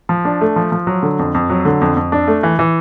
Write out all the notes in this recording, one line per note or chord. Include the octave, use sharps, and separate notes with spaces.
F3
D4
A3
F3
F3
F#3
D3
F2
F2
F#3
D3
F2
F2
D4
A3
E3
E3